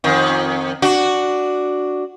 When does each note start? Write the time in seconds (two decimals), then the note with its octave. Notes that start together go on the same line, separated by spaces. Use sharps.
0.04 F2 D#3
0.82 D4 F#4